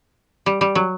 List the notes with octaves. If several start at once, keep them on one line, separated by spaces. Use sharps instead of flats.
G3
G3
F#3